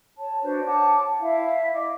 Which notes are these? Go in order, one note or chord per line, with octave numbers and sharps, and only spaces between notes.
C#5 A5
D4 F#4 B4 C5
C#5 F#5 A5 D6
E4 E5 F5
D#5 D6